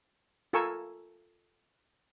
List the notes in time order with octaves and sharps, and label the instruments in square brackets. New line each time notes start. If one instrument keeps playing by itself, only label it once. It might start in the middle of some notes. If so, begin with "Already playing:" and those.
[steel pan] F4 A4 A#4 G#5 C#6 E6